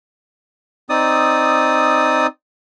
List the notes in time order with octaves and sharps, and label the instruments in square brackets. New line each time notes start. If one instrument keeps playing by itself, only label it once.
[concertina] C4 D#4 D5 D#6